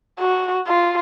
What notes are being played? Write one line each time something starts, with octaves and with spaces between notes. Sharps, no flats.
F#4
F4